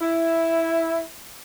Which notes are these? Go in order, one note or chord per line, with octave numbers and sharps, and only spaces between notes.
E4